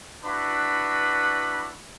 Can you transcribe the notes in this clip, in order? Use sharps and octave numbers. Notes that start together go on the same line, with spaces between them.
D4 E4 F#4 B4 B5